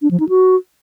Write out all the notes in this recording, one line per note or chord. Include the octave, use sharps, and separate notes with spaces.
D4
F3
D#4
F#4